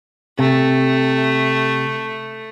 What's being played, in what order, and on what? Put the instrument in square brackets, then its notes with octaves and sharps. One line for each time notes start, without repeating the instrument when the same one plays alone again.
[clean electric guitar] C3 [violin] A3